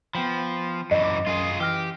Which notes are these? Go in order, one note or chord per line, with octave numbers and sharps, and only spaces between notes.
F3 B3 G5 B5
F#2 E3 D#5
D6
F#2 F4 G#4 C6 D#6
E3 G4 E6 F6 A#6